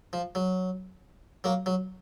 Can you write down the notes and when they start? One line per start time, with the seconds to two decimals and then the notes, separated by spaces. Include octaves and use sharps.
0.13 F3
0.35 F#3
1.44 F#3 A#3
1.66 F#3